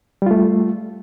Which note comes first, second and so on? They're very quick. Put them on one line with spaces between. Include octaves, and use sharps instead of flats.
G3 F4 A3